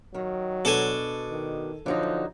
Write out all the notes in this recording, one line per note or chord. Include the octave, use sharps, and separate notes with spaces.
D#3 F#3
B2 D4 A4 G#5
D#3
D3 F3 F#3 D#4